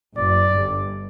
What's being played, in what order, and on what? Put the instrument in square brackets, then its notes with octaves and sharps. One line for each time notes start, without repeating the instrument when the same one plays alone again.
[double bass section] F#1 F#2 [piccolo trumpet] D5
[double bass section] G1 G2